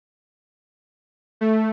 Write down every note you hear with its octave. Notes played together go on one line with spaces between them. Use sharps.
A3